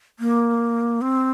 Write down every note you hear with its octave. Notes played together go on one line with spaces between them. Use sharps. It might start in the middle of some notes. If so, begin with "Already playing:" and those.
A#3
C4